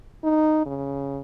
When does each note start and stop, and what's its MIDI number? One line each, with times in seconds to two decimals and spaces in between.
0.24 0.65 63
0.66 1.21 49